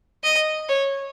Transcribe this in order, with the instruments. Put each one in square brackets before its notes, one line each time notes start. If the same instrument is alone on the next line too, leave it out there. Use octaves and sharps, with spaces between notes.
[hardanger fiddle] D#5
C#5